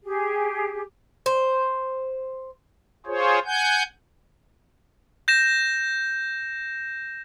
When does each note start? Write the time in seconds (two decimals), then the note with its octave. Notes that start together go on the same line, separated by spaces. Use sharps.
0.04 G4 G#4
1.26 C5
3.06 F4 G#4 C5 C#5
3.45 F#5 G#5 G6
5.28 G6 A#6 E7